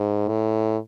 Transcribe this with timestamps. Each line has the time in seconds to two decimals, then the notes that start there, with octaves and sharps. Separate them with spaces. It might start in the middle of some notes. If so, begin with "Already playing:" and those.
Already playing: G#2
0.29 A2